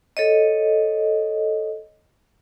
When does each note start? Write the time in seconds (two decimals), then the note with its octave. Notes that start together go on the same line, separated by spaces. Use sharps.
0.17 A4 C#5 D#5